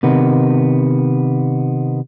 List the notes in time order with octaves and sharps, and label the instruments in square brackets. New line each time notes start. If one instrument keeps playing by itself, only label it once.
[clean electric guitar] C3 D#3 B3